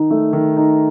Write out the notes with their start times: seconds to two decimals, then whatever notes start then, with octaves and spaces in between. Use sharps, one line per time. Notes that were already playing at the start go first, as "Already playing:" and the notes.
Already playing: D#3 D#4
0.11 A3
0.33 D#3
0.57 D#4